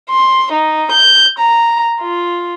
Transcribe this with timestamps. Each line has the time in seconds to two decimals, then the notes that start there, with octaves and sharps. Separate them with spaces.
0.10 C6
0.52 D#4
0.92 G6
1.38 A#5
2.01 F4